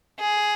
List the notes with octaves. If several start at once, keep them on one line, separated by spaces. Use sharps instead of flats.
G#4